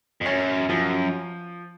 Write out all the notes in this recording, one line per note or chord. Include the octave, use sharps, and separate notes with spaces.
F2
F#2 C#4
F#2 F3